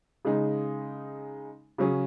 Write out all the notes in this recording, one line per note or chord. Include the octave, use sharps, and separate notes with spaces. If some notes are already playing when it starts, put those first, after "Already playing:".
C#3 G#3 D#4 G#4
C#3 F#3 C#4 G#4